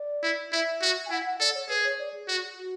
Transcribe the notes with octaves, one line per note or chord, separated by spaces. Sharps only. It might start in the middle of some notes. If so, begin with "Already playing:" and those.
Already playing: D5
E4
E4 E5
F#4
G#5
E4 F#5
F#5
A4 D5
C#5
G#4 B4
C#5
D5
G#4
F#4
F#4